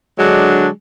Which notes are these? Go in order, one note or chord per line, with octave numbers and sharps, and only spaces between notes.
D3 F#3 G#3 D4